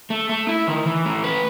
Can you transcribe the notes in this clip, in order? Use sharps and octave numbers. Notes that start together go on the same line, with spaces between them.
A3
A3
E4
D#3
E3
A3
B4